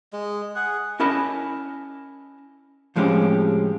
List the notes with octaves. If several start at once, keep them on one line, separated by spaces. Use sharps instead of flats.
G#3
G#4 F#5
C#4 E4 A#4 D#5 A5 B5
A2 F3 G#3 C4 C#4 G4